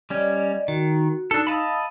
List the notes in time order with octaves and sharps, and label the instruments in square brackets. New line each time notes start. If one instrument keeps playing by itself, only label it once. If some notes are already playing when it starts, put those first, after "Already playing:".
[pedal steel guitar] G3 C#4 [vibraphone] D5 D#5
[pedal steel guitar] D#3 [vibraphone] F#4
[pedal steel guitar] D4 A4 [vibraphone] D#4
[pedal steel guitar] D#5 A5 B5 [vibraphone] F5 D#6 E6